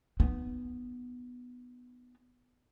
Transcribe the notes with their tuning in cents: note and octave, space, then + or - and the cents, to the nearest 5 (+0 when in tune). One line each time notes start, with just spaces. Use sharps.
B3 +0 D#4 -35